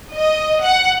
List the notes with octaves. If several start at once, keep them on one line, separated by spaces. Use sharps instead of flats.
D#5
F#5